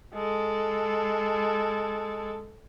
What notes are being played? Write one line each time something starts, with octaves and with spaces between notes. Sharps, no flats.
G#3 A4